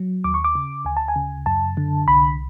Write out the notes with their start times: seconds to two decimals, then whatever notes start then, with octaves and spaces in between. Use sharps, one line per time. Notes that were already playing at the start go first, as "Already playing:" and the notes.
Already playing: F#3
0.24 D#2 D6
0.34 C#6
0.44 D6
0.55 C#3
0.85 D2 G#5
0.97 A5
1.08 G#5
1.16 C#3
1.46 F#2 A5
1.77 D3
2.08 C2 B5